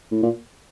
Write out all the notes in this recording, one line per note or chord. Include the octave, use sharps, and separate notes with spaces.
A2
A#2